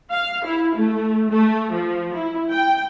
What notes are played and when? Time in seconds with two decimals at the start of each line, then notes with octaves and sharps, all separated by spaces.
0.11 F5
0.45 E4
0.75 A3
1.30 A3
1.72 F3
2.14 E4
2.51 G5